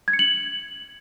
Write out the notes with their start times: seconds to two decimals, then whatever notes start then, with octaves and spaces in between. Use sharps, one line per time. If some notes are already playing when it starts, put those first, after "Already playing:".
0.08 G#6
0.13 C#7
0.19 F#7